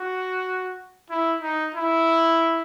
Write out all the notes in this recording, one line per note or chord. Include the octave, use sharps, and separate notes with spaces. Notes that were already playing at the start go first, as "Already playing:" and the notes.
Already playing: F#4
E4
D#4
E4